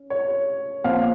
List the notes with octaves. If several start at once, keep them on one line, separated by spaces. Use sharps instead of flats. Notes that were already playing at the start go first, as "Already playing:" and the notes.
Already playing: C#4
C#5
A#2 F3 C4 F5